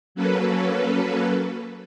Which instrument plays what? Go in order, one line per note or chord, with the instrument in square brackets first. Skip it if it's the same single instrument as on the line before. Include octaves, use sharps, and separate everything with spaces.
[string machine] F#3 A#3 C#4 A4 B4